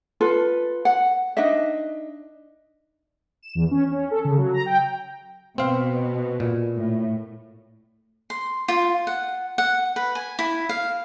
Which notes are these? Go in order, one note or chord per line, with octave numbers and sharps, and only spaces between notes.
F4 A4 B4
F#5
D4 D#4 D#5 E5
E7
E2
C#4
C#4
A4
C#3
F#3
A#5
G5
B2 C4 F5
A#2
A2
C6
F4
F#5
F#5
B4
G#5
E4
F5